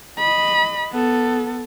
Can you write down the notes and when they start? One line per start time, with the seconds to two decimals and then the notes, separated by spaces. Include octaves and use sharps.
0.19 D#5 B5
0.92 B3 A4